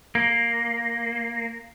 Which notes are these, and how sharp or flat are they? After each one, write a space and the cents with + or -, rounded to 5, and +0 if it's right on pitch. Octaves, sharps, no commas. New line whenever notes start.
A#3 +0